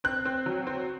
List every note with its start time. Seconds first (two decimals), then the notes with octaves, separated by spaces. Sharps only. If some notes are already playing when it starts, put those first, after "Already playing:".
0.04 C4 F#6
0.25 C4
0.46 F#3
0.67 C4